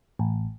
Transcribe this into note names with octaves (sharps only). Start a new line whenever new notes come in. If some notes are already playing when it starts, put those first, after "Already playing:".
A1